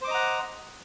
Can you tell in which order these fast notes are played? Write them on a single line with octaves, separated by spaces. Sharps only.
C5 D6 D#5 A#5 F#5